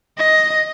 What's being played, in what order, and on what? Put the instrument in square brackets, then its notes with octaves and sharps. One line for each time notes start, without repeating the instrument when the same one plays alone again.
[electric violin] D#5